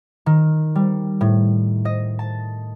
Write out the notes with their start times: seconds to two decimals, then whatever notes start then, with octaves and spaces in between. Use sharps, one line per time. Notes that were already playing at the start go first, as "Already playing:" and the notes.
0.26 D#3
0.75 G3
1.21 A2
1.85 D#5
2.19 A5